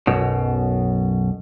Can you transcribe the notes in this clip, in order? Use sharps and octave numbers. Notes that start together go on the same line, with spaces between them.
B1 F#2 B2